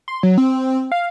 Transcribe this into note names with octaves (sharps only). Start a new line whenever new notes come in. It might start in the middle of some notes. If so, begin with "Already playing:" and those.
C6
F#3
C4
F5